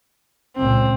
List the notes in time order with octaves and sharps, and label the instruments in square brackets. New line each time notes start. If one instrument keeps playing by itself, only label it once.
[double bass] C#2 A#2 [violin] C4